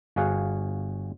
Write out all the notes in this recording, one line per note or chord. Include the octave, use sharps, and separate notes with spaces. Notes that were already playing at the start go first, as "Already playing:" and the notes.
G1 F#4 G#4 F5 F#5